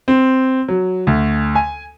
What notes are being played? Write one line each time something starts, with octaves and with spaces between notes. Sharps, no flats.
C4
F#3
D2
G#5